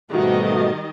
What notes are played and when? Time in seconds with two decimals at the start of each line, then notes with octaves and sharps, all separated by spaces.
0.11 G#2 B2 D#3 G3 A3 F#4 D#5